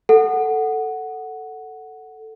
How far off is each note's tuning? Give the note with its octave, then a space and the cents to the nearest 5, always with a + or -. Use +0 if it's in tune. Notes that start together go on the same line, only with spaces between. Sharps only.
A4 +5 F#5 +0